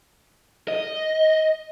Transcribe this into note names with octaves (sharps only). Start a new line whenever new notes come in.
D#5